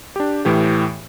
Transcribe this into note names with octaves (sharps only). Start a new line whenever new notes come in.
D4 G4
A2 E3 G4